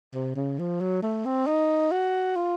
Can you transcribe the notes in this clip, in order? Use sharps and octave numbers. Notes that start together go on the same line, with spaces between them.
C3
C#3
F3
F#3
A3
C4
D#4
F#4
F4